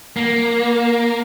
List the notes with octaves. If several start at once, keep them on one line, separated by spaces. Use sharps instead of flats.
A#3